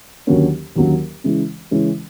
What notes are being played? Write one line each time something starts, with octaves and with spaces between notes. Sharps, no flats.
D#2 D3 F#3 A#3 C#4
D#2 D3 F#3 A#3 C#4
C#3 E3 G#3 C#4
C#3 E3 G#3 C#4